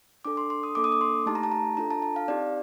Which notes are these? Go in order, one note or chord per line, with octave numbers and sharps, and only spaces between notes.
D4 A4 D6
C6
C6
D#6
A#3 D4 A4 D6
D#6
D6
C6
A3 D#4 G4 A5
A#5
A5
A#5
D4 F4 A4 A#5
A5
A5
F5
C4 D#4 G4 D5